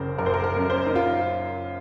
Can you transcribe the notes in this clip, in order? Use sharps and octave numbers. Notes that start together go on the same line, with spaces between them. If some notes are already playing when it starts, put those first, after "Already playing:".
Already playing: F#1 C#3 A#4 C5
F#1 A#4
C5
A#4
A#4
F#2
C5
D#4
F4